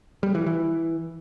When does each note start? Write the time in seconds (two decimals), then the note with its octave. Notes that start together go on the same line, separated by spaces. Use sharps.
0.23 G3
0.35 E3
0.46 E3